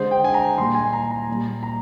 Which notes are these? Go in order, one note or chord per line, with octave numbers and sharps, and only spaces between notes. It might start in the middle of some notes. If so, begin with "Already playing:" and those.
Already playing: D3 G#3 C5
G5
G#5
A#5
A#2 G3 C6
G#5
A#5
A#5
A#2 G3
A#5